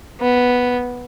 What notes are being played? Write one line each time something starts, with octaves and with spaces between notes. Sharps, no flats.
B3